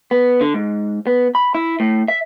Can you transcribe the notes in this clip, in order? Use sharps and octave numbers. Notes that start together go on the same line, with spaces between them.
B3
D3
G#2
B3
B5
E4
A2
E5